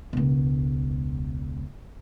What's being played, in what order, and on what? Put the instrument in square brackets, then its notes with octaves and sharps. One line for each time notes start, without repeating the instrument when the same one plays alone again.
[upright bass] E1 C#2